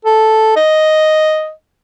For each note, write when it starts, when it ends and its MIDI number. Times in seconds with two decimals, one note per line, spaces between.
0.05 0.53 69
0.56 1.51 75